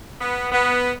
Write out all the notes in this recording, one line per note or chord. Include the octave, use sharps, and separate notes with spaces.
B3
B3